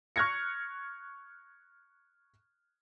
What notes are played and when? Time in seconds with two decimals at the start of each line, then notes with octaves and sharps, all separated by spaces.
0.16 C#6 F6 F#6 G#6 A#6 C#7